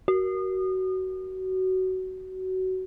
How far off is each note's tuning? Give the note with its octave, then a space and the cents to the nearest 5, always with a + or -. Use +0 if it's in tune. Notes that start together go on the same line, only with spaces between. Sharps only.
F#4 +20